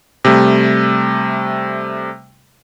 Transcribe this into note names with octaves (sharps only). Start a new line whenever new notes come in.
C3 G3 A3